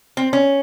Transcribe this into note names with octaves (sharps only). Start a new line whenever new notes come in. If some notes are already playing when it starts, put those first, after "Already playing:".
C4
C#4